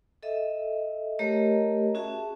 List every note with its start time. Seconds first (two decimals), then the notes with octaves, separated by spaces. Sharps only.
0.23 A4 D#5 E5
1.19 A3 G4 A#4 C#5 D#5 A#5
1.95 C#4 F#4 G#4 E5 A5